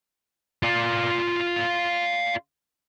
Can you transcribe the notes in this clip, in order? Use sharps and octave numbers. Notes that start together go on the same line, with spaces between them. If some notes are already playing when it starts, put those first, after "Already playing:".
F4 D5